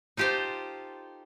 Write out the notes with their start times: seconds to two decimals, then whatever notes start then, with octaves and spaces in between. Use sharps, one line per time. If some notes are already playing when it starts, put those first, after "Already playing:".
0.17 D#4 F4 G4 A4 C5